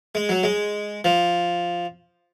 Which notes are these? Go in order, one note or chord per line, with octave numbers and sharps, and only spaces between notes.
G#3
F#3
G#3
F3